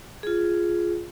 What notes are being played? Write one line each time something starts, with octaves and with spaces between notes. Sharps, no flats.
F4 G#4